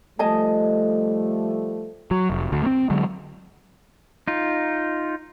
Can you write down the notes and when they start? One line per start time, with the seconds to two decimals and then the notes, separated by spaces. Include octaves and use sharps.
0.19 F3 G3 A3 D#5 G#5 A5
2.11 F#3
2.30 F1
2.52 D2 D3
2.63 A#3 C4
2.90 D3 F#3 G#3
4.28 D#4 F4